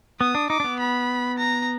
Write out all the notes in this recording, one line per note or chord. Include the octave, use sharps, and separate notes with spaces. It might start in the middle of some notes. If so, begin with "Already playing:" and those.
B3 D#6
D4
D#4 D6
D4
B3
B5
A#5